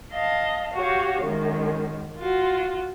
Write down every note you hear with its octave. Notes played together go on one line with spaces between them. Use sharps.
D#5 F5 A5
F#4 G4 C#5 F5
F#2 D#3 G#3
F4 F#4